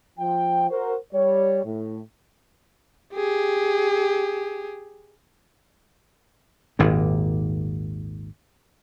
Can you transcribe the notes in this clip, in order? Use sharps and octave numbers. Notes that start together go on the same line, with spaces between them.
F3 G5
F#4 A#4 C5
G3 C#5
A2
G4 G#4
G#1 D#2 A#2